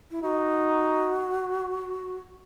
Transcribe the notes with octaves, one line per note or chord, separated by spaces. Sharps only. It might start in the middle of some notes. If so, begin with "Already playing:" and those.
E4
D#4 F#4